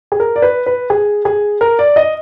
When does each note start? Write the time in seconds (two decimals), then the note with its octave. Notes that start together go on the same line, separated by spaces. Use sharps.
0.12 G#4
0.20 A#4
0.36 D5
0.42 B4
0.66 B4
0.90 G#4
1.25 G#4
1.61 A#4
1.79 D5
1.96 D#5